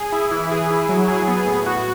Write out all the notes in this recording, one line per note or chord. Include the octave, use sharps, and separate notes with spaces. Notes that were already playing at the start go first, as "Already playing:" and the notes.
Already playing: G#4
E4
E3
G#4
E4
F#3
G#4
B3
A2
F#4